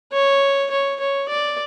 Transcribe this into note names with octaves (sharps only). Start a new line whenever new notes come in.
C#5
C#5
C#5
D5